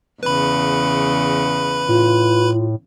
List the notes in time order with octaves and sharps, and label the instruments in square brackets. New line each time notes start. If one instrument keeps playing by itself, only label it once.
[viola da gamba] E2 C#3 [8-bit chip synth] B4 B5
[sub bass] A2 [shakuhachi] F4